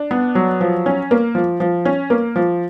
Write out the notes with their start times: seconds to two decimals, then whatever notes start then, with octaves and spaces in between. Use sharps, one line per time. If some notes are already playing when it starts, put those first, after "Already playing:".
Already playing: D4
0.11 B3
0.35 F#3
0.61 F3
0.86 C#4
1.11 A#3
1.35 F3
1.60 F3
1.85 C#4
2.10 A#3
2.36 F3